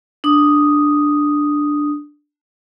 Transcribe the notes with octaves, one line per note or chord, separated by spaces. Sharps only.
D4 D#6